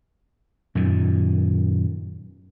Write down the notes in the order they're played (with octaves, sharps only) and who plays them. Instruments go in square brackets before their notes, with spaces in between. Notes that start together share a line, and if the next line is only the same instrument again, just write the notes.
[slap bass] F#2 A#2 D#3